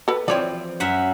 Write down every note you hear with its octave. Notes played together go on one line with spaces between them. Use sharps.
A4 B4
E3 F3 C4 C#5 D5
F#2 E5 F#5